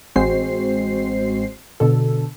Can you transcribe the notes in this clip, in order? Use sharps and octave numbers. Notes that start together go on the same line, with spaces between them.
A1 G#3 C4 F#4 C5 C7
B2 D3 A4